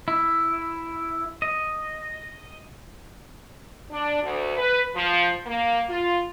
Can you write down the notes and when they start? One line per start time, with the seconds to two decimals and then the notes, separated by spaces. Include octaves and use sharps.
0.08 E4
1.42 D#5
3.91 D4
4.22 D2
4.57 B4
4.95 F3
5.45 A#3
5.88 F4